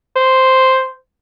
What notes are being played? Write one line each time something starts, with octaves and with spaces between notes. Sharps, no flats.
C5